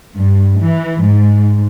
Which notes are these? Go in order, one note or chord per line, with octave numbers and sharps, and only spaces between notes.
G2
E3
G#2